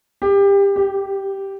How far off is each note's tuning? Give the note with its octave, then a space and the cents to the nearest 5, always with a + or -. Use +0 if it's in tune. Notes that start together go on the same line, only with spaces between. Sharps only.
G4 +25
G4 -5